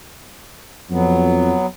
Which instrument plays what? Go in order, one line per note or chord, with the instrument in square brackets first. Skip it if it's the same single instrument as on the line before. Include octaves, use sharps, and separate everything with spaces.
[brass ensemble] F2 [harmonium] F#3 B3